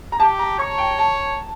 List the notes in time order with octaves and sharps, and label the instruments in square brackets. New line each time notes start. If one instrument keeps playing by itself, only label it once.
[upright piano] A#5
[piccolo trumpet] G4 [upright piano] A5
[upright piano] A#5
[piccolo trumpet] C#5 [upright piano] C#6
[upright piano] G5
A5